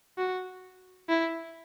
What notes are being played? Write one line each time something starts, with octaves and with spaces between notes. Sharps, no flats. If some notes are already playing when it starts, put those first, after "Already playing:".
F#4
E4